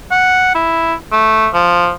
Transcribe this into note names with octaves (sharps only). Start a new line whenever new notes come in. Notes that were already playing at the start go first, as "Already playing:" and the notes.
F#5
E4
A3
F3